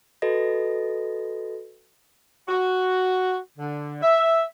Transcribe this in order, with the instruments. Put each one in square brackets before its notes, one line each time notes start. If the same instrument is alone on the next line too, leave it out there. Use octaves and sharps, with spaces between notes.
[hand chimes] F#4 A4 B4 D#5 A#6
[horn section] F#4
D3
E5